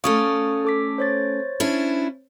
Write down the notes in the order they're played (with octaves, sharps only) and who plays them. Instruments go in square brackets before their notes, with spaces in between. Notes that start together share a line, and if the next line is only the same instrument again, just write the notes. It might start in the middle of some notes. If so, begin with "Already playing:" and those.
[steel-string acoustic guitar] A3 C#4 D5 [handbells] F5 C#6 D#6
[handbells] A4 D6 B6
C5 C#5 A6
[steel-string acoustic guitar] C#4 D4 E4